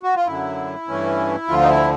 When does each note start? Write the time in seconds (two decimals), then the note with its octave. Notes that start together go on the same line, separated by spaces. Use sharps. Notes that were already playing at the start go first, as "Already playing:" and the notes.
0.03 F#4
0.16 F4
0.27 F#2 D3 F#3 E4
0.88 G2 E3 A3 C#4
1.48 D2 D3 F3 F4
1.62 D#4
1.69 E4